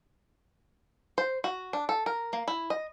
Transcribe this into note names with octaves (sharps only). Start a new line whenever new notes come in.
C5
F#4
D4
A4
A#4
A#3
E4
D#5